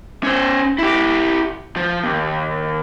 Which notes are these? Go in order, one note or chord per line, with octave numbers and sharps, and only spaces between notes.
C#4 C5
E4 G4
F3
D#2